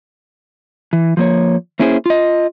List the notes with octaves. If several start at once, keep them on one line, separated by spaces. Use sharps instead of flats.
E3
F3 A#3 C#5
A#3 C#4 E4 G#4 C5
F4 D#5